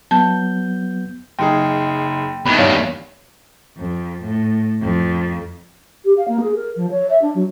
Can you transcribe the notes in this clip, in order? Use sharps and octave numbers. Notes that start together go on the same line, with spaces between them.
F#3 B3 A5 G6
F#1 D#4 G#4 G5
E2 D#3 B5
G2 C#5 F5
F2
A2
F2
G4
F5
A#3
G#4
A#4
F3
C#5
E5
D4
F#3